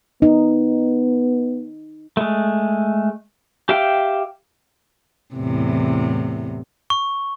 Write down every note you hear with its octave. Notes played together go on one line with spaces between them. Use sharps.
B3 D#4
G#3 A3
G4 E5 F5 G5
E2 A2 C3
C#6